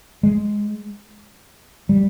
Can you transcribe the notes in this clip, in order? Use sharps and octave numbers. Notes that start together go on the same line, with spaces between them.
G#3
G3